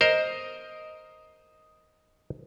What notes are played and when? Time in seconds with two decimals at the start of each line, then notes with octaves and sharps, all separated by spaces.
0.01 A#4 C5 D#5